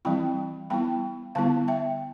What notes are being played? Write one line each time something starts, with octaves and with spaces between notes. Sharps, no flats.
E3 G3 C4 E4 G5 B5
G3 B3 E4 G5 B5
D3 G3 B3 E4 F5 A5
E5 G5